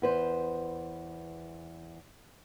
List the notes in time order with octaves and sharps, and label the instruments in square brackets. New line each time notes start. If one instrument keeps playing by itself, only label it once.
[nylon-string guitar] E2 B4 C5